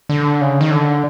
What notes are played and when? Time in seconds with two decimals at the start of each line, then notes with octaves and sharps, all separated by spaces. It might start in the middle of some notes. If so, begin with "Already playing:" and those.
0.09 D3
0.41 C#3
0.61 D#3
0.71 D3